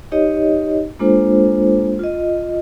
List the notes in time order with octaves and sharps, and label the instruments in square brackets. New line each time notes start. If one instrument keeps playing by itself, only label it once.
[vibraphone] D#4 G4 C#5 D#5
G#3 A#3 D4 F4 A4 C5
F4 D#5